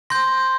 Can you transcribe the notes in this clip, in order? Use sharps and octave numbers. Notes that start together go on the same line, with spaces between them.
C6 G6 A#6